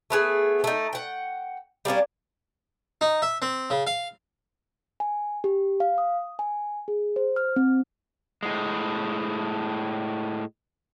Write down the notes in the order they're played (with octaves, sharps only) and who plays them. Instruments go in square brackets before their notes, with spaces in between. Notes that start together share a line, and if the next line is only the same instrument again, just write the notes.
[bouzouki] A3 B3 G#4
A3 D#4
F#5 G5
G3 A#3 C#4 D4
[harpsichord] D#4
E5
C4
C#3
F5
[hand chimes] G#5
G4
F5
D#6
G#5
G#4
C5
F6
C4
[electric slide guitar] A2 G#3